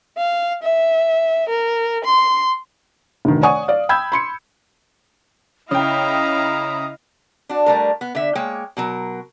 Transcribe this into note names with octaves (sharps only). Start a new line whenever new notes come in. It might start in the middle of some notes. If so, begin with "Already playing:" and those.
F5
E5
A#4
C6
F1 D2 D#3
C#5 D5 F#5 G#5 C#6 D#6
D5 F5
G5 B5 E6 G6 G#6
B5 C6 C#7
C#3 E4 D#5 F5 G5 A#5 D#6
D4 F#4
G3 A3 A#4
B3
D3 E5
G#3 A#3 C#5 G5
B2 F#3 A#4